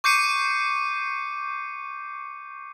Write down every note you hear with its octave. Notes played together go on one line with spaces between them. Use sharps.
C#6 D6 G6 C7 C#7 D#7